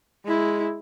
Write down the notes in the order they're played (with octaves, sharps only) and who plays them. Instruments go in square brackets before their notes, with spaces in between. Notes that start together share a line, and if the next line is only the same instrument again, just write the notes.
[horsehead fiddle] G#3 E4